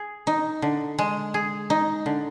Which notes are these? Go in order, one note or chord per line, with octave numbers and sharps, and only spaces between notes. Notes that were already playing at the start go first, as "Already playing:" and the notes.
Already playing: G#4
D#4
D3
G#3
G#4
D#4
D3